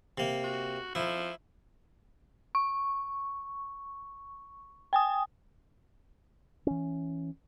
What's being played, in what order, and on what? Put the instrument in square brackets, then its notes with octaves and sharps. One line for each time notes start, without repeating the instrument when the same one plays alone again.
[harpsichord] C3 A#3
[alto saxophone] F#4
[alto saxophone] F3 [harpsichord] E4
[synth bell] C#6
G5 G#5 D#6
[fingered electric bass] E3 C#4